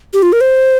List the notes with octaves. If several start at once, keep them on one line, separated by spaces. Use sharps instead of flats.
G4
F4
A#4
C5